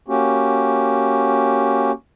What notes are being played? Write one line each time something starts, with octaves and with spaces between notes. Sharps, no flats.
A#3 C#4 F#4 G4